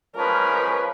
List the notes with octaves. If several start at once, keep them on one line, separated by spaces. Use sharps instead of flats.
F3 G#3 C#4 A#4 B4